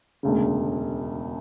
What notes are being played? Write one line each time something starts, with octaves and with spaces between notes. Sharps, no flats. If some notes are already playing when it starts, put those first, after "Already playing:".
E1 D2 C#3